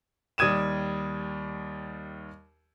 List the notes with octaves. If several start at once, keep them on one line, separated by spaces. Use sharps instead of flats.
D#2 G3 D#6 G#6 D#7 E7